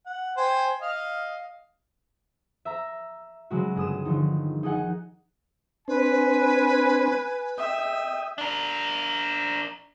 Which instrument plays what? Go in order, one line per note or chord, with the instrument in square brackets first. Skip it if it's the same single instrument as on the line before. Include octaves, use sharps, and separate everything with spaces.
[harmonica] F#5
C5 G5 G#5
D#5 F5
[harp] E5 A#5 A#6
C#3 F#3 G#3 F#4
G1 G#4 D#6 E7
D3 D#3 F3 D#4
D#4 G#4 D#5 F#5 G#5
[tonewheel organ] C4 D4 C5 [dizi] B4 [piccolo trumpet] G#5
[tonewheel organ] D#5 G5 D#6 [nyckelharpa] E5
[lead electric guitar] D4 A#4